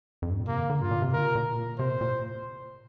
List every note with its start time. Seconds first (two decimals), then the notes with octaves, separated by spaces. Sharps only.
0.22 F2
0.30 G2
0.39 A#2
0.47 C3 A#3
0.58 D3
0.70 D3
0.81 G2 F4
0.91 A#2
1.02 C3
1.13 D3 A#4
1.24 C3
1.35 A#2
1.79 C3 C5
1.90 A#2
2.01 A#2